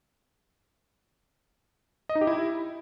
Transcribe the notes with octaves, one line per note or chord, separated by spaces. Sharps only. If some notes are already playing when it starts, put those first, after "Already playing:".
D#5
D#4
G4
E4